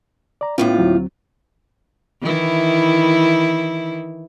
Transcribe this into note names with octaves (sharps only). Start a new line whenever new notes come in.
D5 A#5
D#2 A2 B3 C#4 F4
D2 F#3 C4
D#3 E3 E4